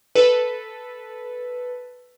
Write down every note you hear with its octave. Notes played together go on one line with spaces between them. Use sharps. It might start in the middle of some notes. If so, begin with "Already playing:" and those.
A4 B4